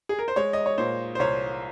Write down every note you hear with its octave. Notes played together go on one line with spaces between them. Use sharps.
G#4
A#4
C5
G#3 C#5
D#5
C#5
A#2 C5
C5
C2 C#5